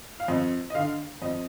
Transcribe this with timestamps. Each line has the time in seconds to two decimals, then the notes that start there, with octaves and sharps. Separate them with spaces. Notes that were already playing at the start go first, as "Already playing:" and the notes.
0.20 F5
0.28 F2 D#5
0.70 D#5
0.75 D3 F5
1.22 F2 D#5